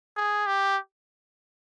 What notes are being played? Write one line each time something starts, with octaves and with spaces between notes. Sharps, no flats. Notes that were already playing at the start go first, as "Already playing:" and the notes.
G#4
G4